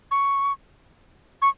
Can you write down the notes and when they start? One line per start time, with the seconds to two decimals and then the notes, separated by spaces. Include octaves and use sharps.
0.11 C#6
1.42 C#6